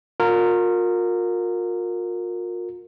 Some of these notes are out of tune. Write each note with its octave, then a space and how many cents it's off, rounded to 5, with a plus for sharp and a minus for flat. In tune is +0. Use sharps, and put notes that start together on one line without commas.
F4 +40 A#4 -15